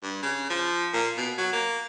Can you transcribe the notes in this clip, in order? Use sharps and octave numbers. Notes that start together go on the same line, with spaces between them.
G2
C#3
F3
A#2
B2
F#3
A#3